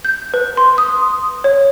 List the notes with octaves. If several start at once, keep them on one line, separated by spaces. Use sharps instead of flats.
G6
B4
C6
D#6
C#5